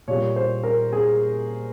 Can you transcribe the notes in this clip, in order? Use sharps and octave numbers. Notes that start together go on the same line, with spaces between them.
A#2 G3 A#3 C#5
C5
A#4
G#4